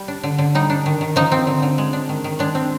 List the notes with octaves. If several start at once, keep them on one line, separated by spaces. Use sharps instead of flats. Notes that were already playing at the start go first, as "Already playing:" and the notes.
Already playing: G3
D4
D3
D3
G3 D#4
D4
D#3
D#3
F3 D#4
C4
D3
D3
G#3
D4
D#3
D#3
G#3 D4
C4